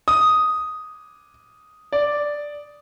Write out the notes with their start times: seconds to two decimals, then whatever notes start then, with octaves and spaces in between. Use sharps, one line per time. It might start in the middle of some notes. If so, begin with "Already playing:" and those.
0.08 D#6
1.93 D5